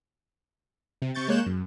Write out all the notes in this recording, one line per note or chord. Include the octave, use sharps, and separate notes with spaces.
C3
C3 C#6 G6 A6
G#3 A#3 C#5 F#6 G6 E7
F#2